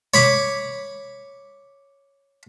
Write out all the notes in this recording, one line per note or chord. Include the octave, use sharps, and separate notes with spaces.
C#5 B5 D6